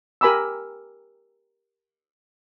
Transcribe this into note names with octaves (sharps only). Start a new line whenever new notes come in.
G4 A#4 G#5 B5 D6 E6